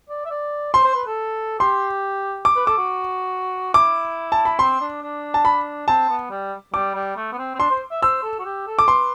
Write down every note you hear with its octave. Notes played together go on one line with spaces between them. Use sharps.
D5
E5
D5
C5 C6
C5
B4
A4
G4 C6
D6
B4
A4 D6
F#4
E4 D6
A5
B5
C4 C6
D4
D4
A5
B5
C4 A5
B3
G3
G3 D6
G3
A3
B3
C4
C4
D4 C6
C5
E5
C5 E6
A4
F#4
G4
A4
D6
B4 C6